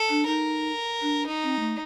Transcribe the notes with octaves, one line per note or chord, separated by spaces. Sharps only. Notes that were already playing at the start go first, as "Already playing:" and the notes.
Already playing: A4
D4
D#4 A#4
D4
D#4
C4
A3